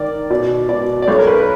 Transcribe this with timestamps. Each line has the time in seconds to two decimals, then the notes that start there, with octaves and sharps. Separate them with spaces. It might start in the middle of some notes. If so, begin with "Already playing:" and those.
Already playing: D#3 A#4 D5
0.30 B2 D5
0.69 B2 D5
1.02 D5
1.08 B1 C#5
1.18 A#4
1.27 B4